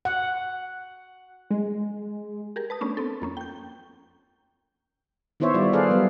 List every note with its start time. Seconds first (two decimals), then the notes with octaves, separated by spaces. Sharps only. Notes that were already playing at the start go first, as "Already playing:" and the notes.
0.05 F#5
1.51 G#3
2.56 G4 G#4 A#4
2.70 B4 A5 D#6
2.81 A3 B3 C#4 D4
2.97 B3 C4 A4
3.22 F2 A#3 C#4
3.37 G5 G6
5.40 D#3 B3 E4 C5 C#5 E5
5.54 G3 F4 D5
5.73 G#4 A4 B4 C5 D5 F5
5.90 F#3 G3 B3